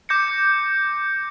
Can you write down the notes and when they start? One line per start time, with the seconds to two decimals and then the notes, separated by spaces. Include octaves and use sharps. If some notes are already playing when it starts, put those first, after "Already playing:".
0.09 D6 G6 A#6 C#7